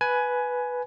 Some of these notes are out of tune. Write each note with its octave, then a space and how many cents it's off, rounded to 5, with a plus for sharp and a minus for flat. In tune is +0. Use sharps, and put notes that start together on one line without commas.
B4 +0 G#5 +15